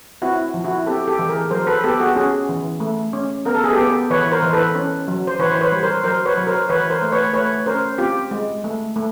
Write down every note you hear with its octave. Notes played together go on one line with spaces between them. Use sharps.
C4 E4 F#4
F3
E4 F#4
C4 G4 A4
G4 A4
E3
G#4 A#4
F#3 A#4 C5
A4 B4
B3 G4 A4
F#4 G#4
C#4 F#4 G#4
E3
A3
C#4
B3 A#4
A4
G#4
B3 G4 A4
E3 B4 C#5
A#4 C5
E3
A4 B4
C#4
F#3
C5
E3 B4 C#5
C5
B4 C#5
G3
A#4 C5
F#3 A#4 C5
B4 C#5
F#3
A#4 C5
E3 B4 C#5
A#4 C5
A3
B4 C#5
A3 B4 C#5
C#4 A#4 C5
C4 F4 G4
G#3
A3
A3